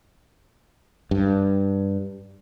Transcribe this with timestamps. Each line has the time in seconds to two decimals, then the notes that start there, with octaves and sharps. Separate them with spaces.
1.11 G2